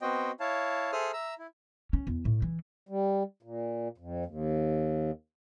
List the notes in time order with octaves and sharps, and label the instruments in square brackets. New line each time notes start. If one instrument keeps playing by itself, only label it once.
[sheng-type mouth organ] B3 C4 F#4 C5 D#5 G5
E4 C#5 F5 A5
G#4 A4 C5 E5 D#6 F6
E5 A#5 E6
E4
[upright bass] C#4
E2
A2
E3
[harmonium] G3
A#2
F2
D#2